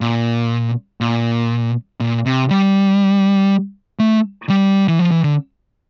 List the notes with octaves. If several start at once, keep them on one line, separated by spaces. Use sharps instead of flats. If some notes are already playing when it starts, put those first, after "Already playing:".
A#2
A#2
A#2
C3
G3
A3
G3
E3
F3
E3
D3